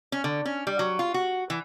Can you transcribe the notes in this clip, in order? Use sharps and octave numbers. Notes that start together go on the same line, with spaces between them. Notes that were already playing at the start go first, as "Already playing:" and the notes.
C#4
D3
C#4
G3
F#3
F4
F#4
E3